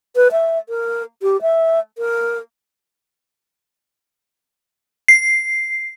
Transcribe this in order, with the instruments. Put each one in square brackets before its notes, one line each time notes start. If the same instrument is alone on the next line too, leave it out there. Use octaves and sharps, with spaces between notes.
[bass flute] B4
E5
A#4
G4
E5
A#4
[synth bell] C7